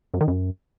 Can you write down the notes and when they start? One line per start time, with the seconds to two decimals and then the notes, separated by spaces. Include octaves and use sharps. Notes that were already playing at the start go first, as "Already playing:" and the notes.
0.14 F#2
0.21 D#3
0.28 F#2